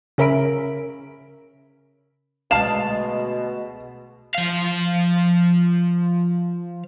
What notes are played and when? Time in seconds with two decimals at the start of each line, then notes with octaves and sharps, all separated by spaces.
0.18 C#3 C#4 A#4 E5 B5 D7
2.51 D2 B2 G#3 F5 A5 E7
4.35 F3 F5